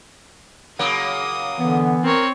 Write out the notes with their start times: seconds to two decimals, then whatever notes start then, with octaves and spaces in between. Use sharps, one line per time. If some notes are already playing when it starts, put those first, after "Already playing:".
0.79 C#3 F#3 A#3 D#6
1.59 D3 E3 B3
2.04 C4 A#4 C#5